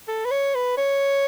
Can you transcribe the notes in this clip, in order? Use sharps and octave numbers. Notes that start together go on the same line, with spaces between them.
A4
B4
C#5
B4
C#5